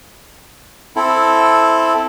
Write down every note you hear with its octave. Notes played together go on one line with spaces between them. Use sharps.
C4 E4 A4